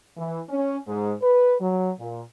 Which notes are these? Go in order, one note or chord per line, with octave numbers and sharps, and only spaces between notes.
E3
C#4
G#2
B4
F#3
A#2